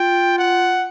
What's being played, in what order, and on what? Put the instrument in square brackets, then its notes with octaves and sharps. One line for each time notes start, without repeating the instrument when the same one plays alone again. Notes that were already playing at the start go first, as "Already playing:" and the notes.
Already playing: [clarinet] F4 [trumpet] G5
[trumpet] F#5